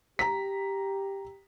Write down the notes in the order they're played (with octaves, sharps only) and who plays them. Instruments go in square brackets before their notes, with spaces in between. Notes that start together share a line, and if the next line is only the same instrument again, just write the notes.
[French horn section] G4 [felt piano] A#5 B6